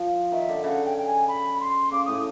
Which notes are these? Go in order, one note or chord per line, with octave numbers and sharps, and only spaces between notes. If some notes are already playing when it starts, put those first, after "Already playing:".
Already playing: F3
D#3 E5
D3
C#3 F#5
G5
G5
G#5
B5
C6
C#3 D6
A2 D#6